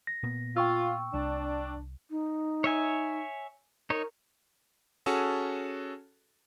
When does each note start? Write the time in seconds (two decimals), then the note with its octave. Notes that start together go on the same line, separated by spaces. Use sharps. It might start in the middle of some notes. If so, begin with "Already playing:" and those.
0.07 A#6
0.23 A#2 A#3 B3
0.57 F4 G5 C#6 E6
1.14 C2 D4
2.10 D#4
2.64 C#5 E5 G#5
3.90 D#4 A#4 C#5
5.06 C#4 F#4 G#4 A4 G#5 A5